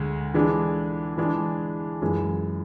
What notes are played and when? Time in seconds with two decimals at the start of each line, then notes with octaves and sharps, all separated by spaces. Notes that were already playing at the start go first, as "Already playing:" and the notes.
Already playing: D2 G#3
0.34 E3 G#3 D4
1.18 E3 G#3 D4 G#4
2.02 F#2 E3 G#3